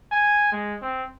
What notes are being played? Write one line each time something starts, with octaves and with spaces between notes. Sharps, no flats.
G#5
G#3
C4